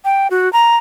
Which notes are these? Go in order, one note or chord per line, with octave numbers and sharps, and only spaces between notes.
G5
F#4
A#5